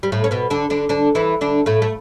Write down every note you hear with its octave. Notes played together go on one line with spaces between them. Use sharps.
G3
A2 A3
C#4
B2 B3
D3 D4
D3 D4
D3 D4
E3 E4
D3 D4
A2 A3
A3